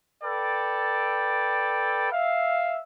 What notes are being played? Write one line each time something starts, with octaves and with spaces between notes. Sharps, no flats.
A4 B4 D5 G5
E5 F5